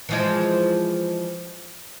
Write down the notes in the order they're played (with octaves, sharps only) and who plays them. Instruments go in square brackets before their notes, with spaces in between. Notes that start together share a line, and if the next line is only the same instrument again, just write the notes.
[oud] E3 F3 G#3